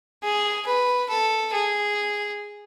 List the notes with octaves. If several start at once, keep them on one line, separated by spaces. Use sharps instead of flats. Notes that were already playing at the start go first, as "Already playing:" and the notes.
G#4
B4
A4
G#4